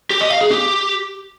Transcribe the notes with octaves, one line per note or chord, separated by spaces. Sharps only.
G4
D#5
F5
G#4
G4